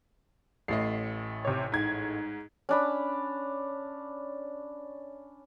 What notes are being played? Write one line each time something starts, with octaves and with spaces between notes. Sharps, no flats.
A1 A2 D#5 C7
C3 C#5
G#2 G#6
C#4 D4 B5